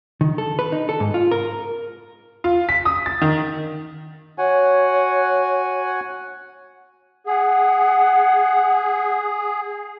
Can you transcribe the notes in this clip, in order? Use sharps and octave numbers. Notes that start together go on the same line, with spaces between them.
D#3
A4
B4
D#4
A4
G#2
F4
A#4
F4
B6
D#6
A6
D#3
F#4 C#5 F#5 G#5
G#4 F#5